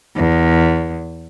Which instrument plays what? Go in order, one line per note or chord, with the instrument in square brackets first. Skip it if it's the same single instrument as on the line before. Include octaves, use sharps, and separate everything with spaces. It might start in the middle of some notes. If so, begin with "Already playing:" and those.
[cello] E2